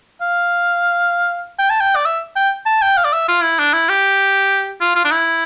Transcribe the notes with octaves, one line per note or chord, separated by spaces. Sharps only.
F5
G5
A5
G5
D5
E5
G5
A5
G5
F5
D5
E5
F4
E4
D4
E4
G4
F4
F4
D4
E4